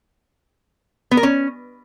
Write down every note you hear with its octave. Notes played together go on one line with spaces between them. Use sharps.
B3
A#4
C#4